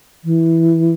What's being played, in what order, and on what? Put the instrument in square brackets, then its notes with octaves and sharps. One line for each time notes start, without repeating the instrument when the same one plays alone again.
[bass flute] E3